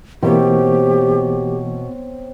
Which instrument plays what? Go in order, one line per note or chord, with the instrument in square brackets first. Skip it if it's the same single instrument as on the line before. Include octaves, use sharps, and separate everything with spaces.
[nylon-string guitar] B2 [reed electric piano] E3 A#3 [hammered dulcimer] C4 C#5 [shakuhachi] G4